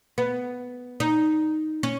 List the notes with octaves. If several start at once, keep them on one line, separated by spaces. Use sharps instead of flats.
B3
D#4
C#4